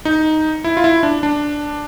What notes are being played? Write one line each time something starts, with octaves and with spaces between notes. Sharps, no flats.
D#4
E4
F4
E4
D4
D4